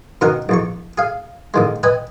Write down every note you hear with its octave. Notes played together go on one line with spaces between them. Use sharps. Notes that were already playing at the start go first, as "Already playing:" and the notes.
B2 D#3 C#4 A#4 F#5
A#1 E2 C#6
G#4 F5
A1 D#3 G#3
B4 D#5 G5 G#5